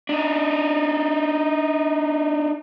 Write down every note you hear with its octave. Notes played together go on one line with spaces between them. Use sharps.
D4 D#4